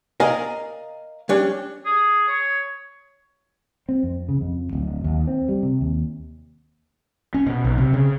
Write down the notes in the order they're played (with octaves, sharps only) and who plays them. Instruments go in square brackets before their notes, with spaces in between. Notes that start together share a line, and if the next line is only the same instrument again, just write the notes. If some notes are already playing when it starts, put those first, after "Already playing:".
[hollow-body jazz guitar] A#4 D5 D#5 F5 G#5 A#5
G3 C#4 D4
[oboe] G#4
C#5
[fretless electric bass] C4
F2
C#3
F2
D1
D#2
C4
G3
C3
D#2
[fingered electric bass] C#4
B2
B1
C3
C#3